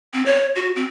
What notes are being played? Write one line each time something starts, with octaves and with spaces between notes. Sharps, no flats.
C4
C#5
F#4
C4